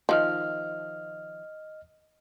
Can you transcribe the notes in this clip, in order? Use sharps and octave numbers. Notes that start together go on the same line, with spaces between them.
D#3 F3 D#5 F6